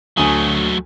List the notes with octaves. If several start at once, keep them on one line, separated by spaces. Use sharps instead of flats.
D2 F#3 A3 G#5 D#6